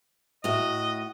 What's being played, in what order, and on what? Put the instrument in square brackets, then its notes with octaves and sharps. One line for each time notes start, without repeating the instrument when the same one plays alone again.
[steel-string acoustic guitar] A2 F#4 [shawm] D#5